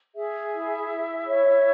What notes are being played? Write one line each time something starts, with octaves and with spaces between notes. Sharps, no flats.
G#4 E5
E4
E4
C#5